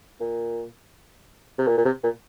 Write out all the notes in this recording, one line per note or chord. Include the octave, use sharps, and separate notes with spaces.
A#2
C3
A#2
A#2
C3
A#2